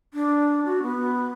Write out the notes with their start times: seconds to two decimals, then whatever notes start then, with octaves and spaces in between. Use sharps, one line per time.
0.14 D4
0.65 F#4
0.83 B3